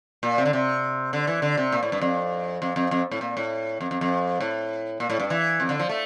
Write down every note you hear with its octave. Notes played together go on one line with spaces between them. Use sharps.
A#2
C3
D3
C3
D3
E3
D3
C3
A#2
A2
G2
F2
F2
F2
F2
A2
A#2
A2
F2
F2
F2
A2
A#2
A2
G2
E3
F2
D3
F3
A3